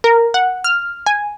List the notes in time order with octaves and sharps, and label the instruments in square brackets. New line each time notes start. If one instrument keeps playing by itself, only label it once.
[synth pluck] A#4
F#5
F6
G#5